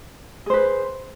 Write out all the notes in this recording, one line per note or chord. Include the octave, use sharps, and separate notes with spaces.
G#4 B4 C5